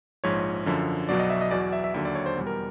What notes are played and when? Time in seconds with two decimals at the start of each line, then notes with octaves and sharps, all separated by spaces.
0.24 A#1 G#2 F3 C#5
0.66 F#2 D3 F3
1.09 B1 B2 F#3 D5
1.19 D#5
1.30 E5
1.41 D#5
1.51 E2 B2 F#3 D5
1.62 D5
1.73 E5
1.84 E5
1.94 D#2 D3 F#3 E5
2.05 D5
2.15 C#5
2.26 C5
2.37 E2 B2 G3
2.47 A#4